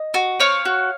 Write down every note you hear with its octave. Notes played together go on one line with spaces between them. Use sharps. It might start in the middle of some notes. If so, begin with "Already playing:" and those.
Already playing: D#5
F#4
C4 C#5 F5
F#4